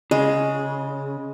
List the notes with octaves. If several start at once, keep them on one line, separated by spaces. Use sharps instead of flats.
C#3 G#3